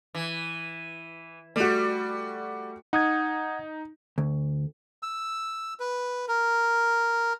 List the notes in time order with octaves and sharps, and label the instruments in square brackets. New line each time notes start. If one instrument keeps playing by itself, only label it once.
[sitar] E3
[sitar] G3 [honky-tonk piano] A3 F#4
[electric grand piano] D#4 [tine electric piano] F#5 D#6 G#6
[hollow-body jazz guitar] D2
[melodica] E6
B4
A#4